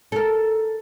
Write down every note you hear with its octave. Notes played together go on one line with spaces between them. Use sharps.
A4 A#4